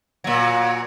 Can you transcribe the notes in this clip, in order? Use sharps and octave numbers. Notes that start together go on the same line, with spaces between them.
A#2 F#3